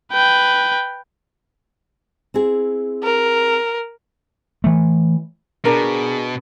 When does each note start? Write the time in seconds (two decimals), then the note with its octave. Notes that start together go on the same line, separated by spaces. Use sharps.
0.12 B4 G5
2.34 C4 E4 G#4
3.03 A#4
4.64 E3 A3
5.65 B2 D4 G#4 A#4